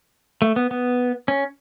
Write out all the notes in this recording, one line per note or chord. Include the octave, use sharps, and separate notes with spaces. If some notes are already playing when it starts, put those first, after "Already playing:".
A3
B3
B3
C#4